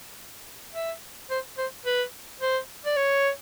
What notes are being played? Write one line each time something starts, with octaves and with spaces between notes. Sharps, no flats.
E5
C5
C5
B4
C5
D5
C#5